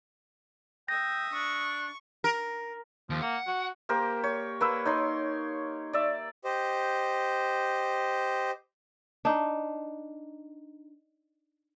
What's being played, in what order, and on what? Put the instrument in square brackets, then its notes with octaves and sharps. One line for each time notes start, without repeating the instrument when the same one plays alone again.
[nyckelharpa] E5 D#6 [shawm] G5 [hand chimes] A#6
[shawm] D4 [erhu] C#6
[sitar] A#4
[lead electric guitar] D#2 [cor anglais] F3
[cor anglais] A#3 [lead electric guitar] F#5
[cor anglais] F#4
[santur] A#3 G4 A#4 C5
C#5
A#3 B4 E6
D#4 C#5 C6
D5 E5
[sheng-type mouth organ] G4 C5 D#5
[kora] D4 D#4